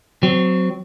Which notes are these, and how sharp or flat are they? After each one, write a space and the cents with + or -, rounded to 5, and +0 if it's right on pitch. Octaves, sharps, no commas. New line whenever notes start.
F#3 +0 C4 -20